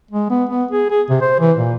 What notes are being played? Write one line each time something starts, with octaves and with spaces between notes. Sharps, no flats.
G#3
B3
B3
G#4
G#4
C3
C5
E3
A#2